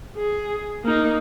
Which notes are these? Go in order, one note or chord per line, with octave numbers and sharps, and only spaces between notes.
G#4
A#3 D#4